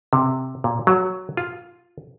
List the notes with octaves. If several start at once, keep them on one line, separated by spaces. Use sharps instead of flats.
C3
A#2
F#3
F4